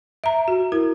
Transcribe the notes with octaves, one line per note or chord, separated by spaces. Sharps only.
E5 A#5
F#4
E4 A#4